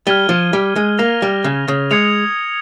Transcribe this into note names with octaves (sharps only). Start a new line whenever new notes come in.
G3 F6 G#6 D#7 G7
F3
G3
G#3
A#3 F6 A#6 F7
G3
C#3
C#3
G#3 D#6 G#6 C#7 F7